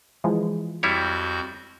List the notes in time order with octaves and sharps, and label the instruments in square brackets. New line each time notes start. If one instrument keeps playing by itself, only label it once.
[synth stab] E3 F3 G#3
[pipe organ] F2 F#4 G6 [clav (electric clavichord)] G3 E4 C#5